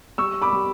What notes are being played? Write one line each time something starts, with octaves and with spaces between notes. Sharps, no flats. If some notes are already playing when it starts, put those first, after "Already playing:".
G3 C#6 E6
B5 D6
G3